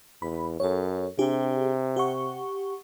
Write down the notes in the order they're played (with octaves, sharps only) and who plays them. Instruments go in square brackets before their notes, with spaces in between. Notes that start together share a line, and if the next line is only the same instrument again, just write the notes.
[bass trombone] E2 [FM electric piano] B5
[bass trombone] F#2 [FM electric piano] A4 C#5
[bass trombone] C3 [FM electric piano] D4 G4 G#4
[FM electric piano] G4 F#5 C#6